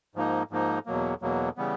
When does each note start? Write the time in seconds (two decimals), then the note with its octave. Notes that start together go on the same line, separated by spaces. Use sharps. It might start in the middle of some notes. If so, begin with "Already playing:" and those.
0.15 G#2 F3 A#3 D#4
0.51 G#2 F3 A#3 D#4
0.86 E2 B2 F#3 A#3
1.22 E2 B2 F#3 A#3
1.57 C#3 E3 G3 B3